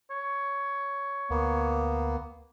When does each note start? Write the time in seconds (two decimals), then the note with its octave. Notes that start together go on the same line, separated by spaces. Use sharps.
0.10 C#5
1.30 D2 A#3 B3